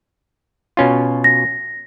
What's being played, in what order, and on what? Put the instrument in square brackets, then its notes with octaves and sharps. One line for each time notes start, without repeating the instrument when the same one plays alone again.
[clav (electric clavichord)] B2 C#4 F4
[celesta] A#6